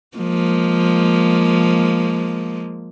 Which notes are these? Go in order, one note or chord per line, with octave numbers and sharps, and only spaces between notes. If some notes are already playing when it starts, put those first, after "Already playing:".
F3 G#3 A#3